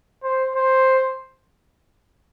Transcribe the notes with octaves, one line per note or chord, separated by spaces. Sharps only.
C5
C5